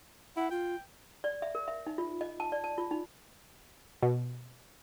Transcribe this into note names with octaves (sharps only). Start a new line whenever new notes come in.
E4 F#5
F4 G5
D5
E5
A#4
E5
D#4
F4
D#5
A5
D5
A5
F4
D#4
B2